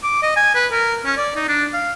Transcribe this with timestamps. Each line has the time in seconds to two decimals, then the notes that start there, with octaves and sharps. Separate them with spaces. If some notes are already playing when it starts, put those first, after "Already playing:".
0.03 D6
0.23 D#5
0.36 G#5
0.55 B4
0.71 A#4
1.05 C#4
1.17 D5
1.36 D#4
1.48 D4
1.74 F5